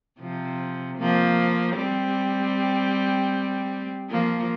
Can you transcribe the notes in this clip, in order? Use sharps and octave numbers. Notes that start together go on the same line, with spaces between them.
C3 F3
F3 A#3
G3 C4
F3 A#3